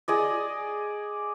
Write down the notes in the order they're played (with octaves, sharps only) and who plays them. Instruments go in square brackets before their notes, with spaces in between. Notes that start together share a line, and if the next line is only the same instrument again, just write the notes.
[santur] G#4 D5 D#5